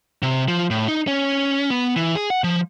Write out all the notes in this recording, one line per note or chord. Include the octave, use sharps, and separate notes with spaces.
C3
F3
A2
D#4
C#4
B3
E3
G#4
F#5
F3